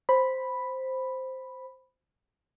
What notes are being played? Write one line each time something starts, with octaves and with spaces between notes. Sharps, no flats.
C5 B5